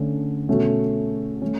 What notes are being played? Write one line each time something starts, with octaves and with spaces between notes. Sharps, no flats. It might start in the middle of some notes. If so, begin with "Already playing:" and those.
Already playing: D3 A3 C#4 A4
B2 A3 C#4 F#4 A4
A3 C#4